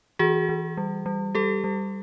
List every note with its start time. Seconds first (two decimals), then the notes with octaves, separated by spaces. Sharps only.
0.19 E3 F#4 G#4
0.49 E3
0.77 G3
1.06 G3
1.35 G3 G4 A4
1.64 G3